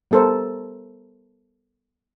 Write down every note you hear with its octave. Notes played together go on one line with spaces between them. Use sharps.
G3 B3 A4 A#4 C5